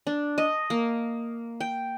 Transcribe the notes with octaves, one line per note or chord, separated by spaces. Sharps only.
D4
D#5
A#3
G5